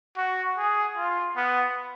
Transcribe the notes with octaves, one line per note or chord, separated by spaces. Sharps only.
F#4
G#4
F4
B3